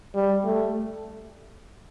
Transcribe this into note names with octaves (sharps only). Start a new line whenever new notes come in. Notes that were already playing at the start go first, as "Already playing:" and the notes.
G3
A3